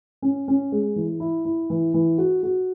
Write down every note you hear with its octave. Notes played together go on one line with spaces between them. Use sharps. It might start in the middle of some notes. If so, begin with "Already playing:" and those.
C#4
C#4
G#3
E3
E4
E4
E3
E3
F#4
F#4